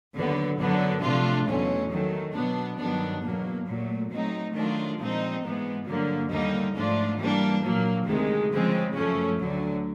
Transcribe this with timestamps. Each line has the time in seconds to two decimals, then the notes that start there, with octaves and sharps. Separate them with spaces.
0.15 D#2 D3 F#3 B3
0.59 F#2 D3 F#3 B3 D4
1.02 C3 F3 A3 D4 F4
1.47 E2 B2 F#3 A3 C#4
1.90 D#3 F#3 A3
2.34 B2 F#3 B3 D4
2.78 G2 D#3 F#3 B3 D4
3.22 E2 B2 F#3 A#3
3.67 A#2 F#3 A3
4.11 F#3 A3 C4 D#4
4.55 D#3 F#3 A3 D4 F4
4.98 A#2 F3 G#3 C4 D#4
5.43 G#2 E3 G#3 B3
5.87 G2 D3 F#3 A#3
6.30 D#2 D3 G3 A#3 D#4
6.74 G#2 F3 A3 D4 F4
7.18 E3 G3 A#3 D4
7.62 A#2 F#3 A#3
8.07 D2 C3 D#3 G#3
8.51 C#3 F3 G#3 C4
8.94 F#2 C#3 F3 A3 C#4
9.38 D2 D3 F#3